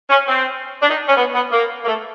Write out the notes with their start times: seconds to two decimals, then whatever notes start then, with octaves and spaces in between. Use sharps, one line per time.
0.10 C#4
0.28 C4
0.82 D4
0.89 D#4
1.08 C#4
1.17 B3
1.34 B3
1.52 A#3
1.83 A#3
1.87 A3